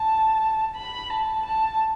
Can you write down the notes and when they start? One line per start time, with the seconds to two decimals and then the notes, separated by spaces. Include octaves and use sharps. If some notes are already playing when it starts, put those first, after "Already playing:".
Already playing: A5
0.75 B5
1.10 A5
1.45 A5